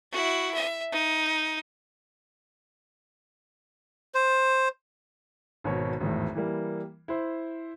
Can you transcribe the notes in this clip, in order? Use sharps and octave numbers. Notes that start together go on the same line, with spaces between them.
E4 F#4
E5
D#4
C5
G#1 B2 C#5
G#1 E2 A2
E3 G3 A#3
E4 C5